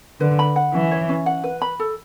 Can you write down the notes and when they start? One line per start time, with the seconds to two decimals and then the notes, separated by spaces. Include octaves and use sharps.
0.21 D3 B4
0.39 B5
0.56 F#5
0.74 E3 C#4
0.91 C#5
1.09 C#4
1.26 F#5
1.44 B4
1.62 B5
1.80 A4